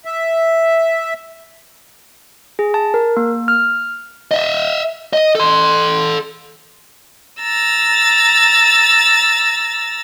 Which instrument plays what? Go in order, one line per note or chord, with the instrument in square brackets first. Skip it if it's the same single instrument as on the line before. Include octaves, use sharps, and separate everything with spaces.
[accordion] E5
[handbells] G#4
A5
A#4
A#3
F6
[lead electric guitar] D#5 E5
D#5
A4 C6
[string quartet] A#5 E6 A6